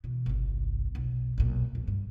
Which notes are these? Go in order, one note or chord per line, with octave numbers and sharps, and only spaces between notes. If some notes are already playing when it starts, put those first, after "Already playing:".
B2 E3
G1 C2
B1
B1 A#2
F2
G2